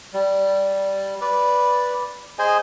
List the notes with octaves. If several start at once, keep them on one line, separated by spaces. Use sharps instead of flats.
G3
B4 D5
G#4 C5 D#5 G#5